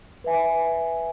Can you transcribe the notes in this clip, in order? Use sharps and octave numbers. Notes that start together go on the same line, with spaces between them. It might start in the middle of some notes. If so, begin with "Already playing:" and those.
B4 E5 G#5